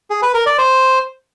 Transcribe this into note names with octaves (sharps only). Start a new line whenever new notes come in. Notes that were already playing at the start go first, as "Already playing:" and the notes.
G#4
B4
A#4
D5
C5